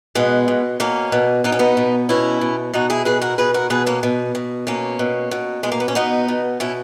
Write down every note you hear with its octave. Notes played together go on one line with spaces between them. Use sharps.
B2 G#3 B3
B2
B2 A#3 C#4
B2
B2 D#4
C#4
B3 D#4
B2
B2 C#4 E4
B2
B2 D#4 F#4
E4 G#4
B2 G#4 B4
F#4 A#4
B2 G#4 B4
F#4 A#4
B2 G#4 B4
A#3 C#4
B2
B2
B2 A#3 C#4
B2
B2
B2 G#3
A#3
B3
C#4
B2 B3 D#4
B2
B2 C#4 E4